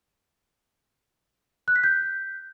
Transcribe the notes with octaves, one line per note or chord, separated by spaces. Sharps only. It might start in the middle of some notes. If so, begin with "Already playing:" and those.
F#6
B6
G6